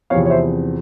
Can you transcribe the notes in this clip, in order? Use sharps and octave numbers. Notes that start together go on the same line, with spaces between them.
E2 C3 F3 C4 C#5 F5
C#5
C5 E5